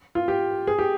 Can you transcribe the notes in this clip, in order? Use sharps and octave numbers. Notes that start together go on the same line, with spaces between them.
F4
G4
G#4
G4